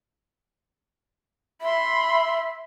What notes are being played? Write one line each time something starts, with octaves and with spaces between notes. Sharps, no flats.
E5 B5 C6